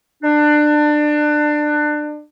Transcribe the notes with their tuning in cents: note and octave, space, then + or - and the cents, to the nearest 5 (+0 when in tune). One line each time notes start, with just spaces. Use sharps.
D4 +25